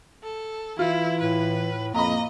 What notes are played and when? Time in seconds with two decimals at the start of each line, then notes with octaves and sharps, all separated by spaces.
0.23 A4
0.79 E3 E4 F4
1.20 A2 B4
1.94 F2 A#3 D#5 A#5 B5